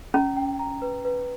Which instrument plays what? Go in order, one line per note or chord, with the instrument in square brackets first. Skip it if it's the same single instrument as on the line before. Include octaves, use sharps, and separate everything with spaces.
[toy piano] C#4 [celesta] A#5
[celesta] G5
A#5
B4
B4